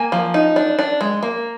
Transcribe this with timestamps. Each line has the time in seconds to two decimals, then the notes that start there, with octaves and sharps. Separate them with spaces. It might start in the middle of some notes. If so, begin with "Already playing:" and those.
Already playing: A#3 G#5
0.12 F3
0.34 D#4
0.56 D4
0.79 D4
1.01 G#3
1.23 A#3